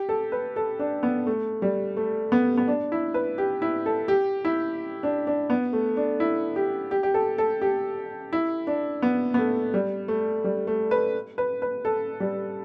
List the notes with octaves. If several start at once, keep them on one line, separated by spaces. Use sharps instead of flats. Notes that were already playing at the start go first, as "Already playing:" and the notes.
Already playing: G4
A4
B4
A4
D4
B3
A3
G3
A3
B3
B3
D4
E4
B4
G4
E4
A4
G4
E4
D4
D4
B3
A3
D4
E4
G4
G4
G4
A4
A4
G4
E4
D4
B3
B3
A3
G3
A3
G3
A3
B4
B4
B4
A4
G3